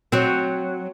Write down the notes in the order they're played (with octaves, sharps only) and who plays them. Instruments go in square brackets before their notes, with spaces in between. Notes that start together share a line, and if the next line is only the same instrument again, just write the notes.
[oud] F#3 C4